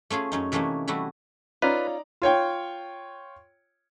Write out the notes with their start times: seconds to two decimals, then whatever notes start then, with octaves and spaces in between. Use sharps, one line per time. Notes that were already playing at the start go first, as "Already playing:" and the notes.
0.10 A3 C#4 F4 G#4
0.32 F#2 C#4 D#4
0.52 C3 E3 A3 A#3 C#4 D#4
0.87 E3 G3 A3 E4 F#4
1.62 C#4 D#4 F4 B4 D5 A#5
2.22 F4 C#5 G5